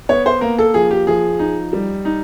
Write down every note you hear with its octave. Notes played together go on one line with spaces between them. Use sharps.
B3 C#5
C5
A#3 A#4
A4
F3 G#4
G4
F3 G#4
D#4
G3
D#4